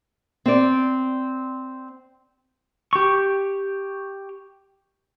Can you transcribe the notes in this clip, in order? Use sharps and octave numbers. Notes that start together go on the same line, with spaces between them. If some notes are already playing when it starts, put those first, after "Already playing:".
C4 D5
G4 C#6